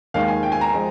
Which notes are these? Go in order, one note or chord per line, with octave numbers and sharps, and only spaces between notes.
D#2 D#3 G#3 F5
G#5
G5
G#5
A#5
F3 G#3